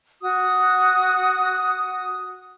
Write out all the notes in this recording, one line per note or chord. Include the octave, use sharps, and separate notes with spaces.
F#4 D#6